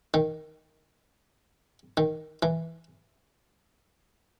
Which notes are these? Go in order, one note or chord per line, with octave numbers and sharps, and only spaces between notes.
D#3
D#3
E3